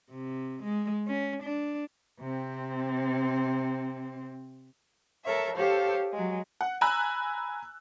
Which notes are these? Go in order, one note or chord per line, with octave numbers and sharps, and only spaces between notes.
C3
G#3
C#4
D4
C3 C4
A4 A#4 C#5 E5
G4 A4 C5 C#5 F5
F#3 G#3
F#5
G#5 A#5 B5 E6 F#6